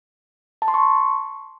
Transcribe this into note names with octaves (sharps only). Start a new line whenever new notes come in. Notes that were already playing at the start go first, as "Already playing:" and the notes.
A5
C6
C#6